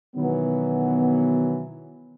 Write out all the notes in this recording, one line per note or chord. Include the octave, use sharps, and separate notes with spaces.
B2 D#3 E3 F#3 B3